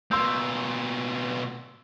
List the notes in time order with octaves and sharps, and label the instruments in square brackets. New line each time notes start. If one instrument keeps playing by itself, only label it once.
[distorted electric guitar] B2 A#3 [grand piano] C6 E6 G6